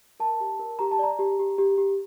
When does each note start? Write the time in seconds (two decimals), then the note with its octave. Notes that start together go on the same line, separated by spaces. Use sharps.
0.20 A#4 A5
0.40 G4
0.59 A#4
0.79 G4 A#5
0.91 A5
0.99 D5 A#5
1.19 G4
1.39 G4
1.58 G4
1.78 G4